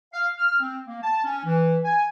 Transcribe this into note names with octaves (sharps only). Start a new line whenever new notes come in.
F5
F6
C4
A#3
A5
C#4
E3
G#5